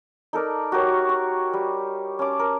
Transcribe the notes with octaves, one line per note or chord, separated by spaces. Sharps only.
D#4 A4 A#4 D5
F#4 G4 A#4 C#5
C#6
G3
C#4 A5 D6
A#4